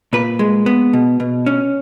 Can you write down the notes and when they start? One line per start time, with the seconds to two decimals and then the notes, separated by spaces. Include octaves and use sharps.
0.13 A#2 B4
0.39 G#3
0.66 B3
0.93 B2
1.20 B2
1.46 C#4